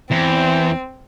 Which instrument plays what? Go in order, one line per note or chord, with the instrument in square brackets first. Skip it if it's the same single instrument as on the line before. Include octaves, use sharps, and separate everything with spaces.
[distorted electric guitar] E2 [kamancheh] C4